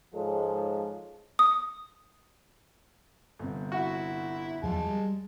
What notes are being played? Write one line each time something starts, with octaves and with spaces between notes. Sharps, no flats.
G#2 F3 G#3 A4 C5 C#5
D#6
G1 C3
E4 F#4
E2 F3 F#3 G#3 A5
G3